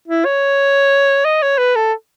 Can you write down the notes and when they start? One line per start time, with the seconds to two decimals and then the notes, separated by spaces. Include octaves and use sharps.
0.08 E4
0.25 C#5
1.25 D#5
1.42 C#5
1.58 B4
1.76 A4